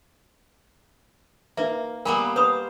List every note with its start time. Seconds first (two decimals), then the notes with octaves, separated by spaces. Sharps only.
1.57 A#3 D#4 B4 E5
2.05 G3 A#3 B3 A#4 G#5
2.36 B4 C5 B5 D#6